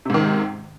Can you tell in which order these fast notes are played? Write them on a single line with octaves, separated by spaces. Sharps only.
C3 G#2 D#3